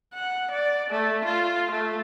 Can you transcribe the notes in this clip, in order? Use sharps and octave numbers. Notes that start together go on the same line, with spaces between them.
F#5
D5
A3
F4
A3